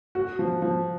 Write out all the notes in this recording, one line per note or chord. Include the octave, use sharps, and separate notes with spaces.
F#4
F3
F3